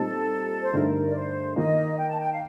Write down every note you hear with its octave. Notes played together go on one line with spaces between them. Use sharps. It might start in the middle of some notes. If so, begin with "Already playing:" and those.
Already playing: A#2 G3 C4 D#4 A4
C5
G2 D3 A3 D#4 A#4
D5
C5
D#3 A#3 D#4 D#5
G5
A5
G5
F5